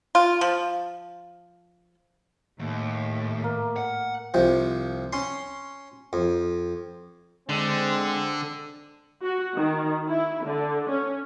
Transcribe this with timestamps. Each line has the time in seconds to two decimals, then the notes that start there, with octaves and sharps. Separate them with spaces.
0.15 F4
0.41 F3
2.59 D#2 A2
3.44 A#3
3.76 F#5
4.34 C2 C3 F3
5.13 C#4 C6
6.13 F2
7.49 D3 G#3 C4
9.23 F#4
9.56 D#3
10.09 E4
10.45 D3
10.90 C#4